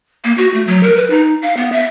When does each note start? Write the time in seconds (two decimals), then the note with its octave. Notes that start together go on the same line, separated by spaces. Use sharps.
0.24 A#3
0.38 F#4
0.54 A3
0.67 F#3
0.83 A#4
0.96 B4
1.10 D#4
1.42 F5
1.57 B3
1.72 E5